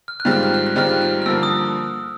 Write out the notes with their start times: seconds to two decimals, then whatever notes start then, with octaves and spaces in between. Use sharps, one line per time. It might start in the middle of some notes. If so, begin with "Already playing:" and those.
0.08 F6
0.20 F#6
0.25 G#2 D#3 G3 C4 F4
0.31 F6
0.43 F#6
0.54 F6
0.67 F#6
0.76 G#2 D#3 G3 C4 F4 F6
0.89 F#6
1.02 F6
1.22 F6
1.26 G2 D3 F3 A#3 E6
1.43 D#6